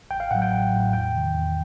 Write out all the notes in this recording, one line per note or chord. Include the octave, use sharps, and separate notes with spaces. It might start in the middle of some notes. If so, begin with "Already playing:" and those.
A1 G5
F5
A2 F#3 F#5
G5
A1
A2 F#3
E2 G5
C3 D#3
E2